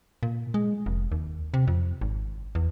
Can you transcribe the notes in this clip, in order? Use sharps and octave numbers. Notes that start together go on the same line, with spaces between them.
A#2
G#3
F1
D#2
C3
F2
G#1
E2